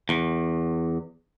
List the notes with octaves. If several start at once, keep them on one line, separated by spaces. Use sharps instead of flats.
E2